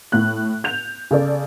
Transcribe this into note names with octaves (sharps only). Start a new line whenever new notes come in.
A2 F#6
G6 F7
C#3 A4 D5